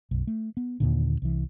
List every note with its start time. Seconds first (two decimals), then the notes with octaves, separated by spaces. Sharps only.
0.11 B1 F#2
0.27 A3
0.57 B3
0.80 D#2 A#2 D3
1.22 C2 E3